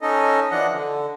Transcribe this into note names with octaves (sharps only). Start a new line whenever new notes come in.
C#4 D#4 A4 D#5
E3 F3 D4 D#5 F#5
D3